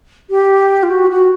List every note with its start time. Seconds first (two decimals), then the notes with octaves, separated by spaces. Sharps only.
0.30 G4
0.83 F4
0.90 F#4
1.10 F#4